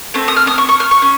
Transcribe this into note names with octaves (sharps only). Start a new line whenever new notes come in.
A3 C4
D#6
F6
D#6
C#6
C#6
F6
C#6
C#4